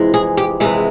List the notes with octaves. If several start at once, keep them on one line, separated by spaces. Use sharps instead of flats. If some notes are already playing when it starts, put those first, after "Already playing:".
Already playing: F2 C3 E3 G#3
G#4
G4
F2 C3 E3 G#3 G#4